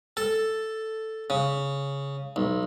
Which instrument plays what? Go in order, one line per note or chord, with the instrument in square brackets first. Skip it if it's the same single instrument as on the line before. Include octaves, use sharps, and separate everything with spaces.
[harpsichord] A4
C#3
B1